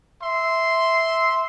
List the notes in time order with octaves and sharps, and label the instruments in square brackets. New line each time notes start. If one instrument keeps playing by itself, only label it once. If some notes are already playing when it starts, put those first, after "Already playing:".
[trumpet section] E5 C6